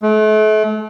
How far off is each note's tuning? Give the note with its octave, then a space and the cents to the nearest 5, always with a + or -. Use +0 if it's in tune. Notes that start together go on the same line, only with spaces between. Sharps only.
A3 -40